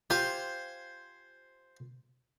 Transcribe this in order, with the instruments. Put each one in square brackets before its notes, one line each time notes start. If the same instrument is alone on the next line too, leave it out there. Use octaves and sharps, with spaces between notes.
[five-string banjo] F4 G4 [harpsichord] C5 G#5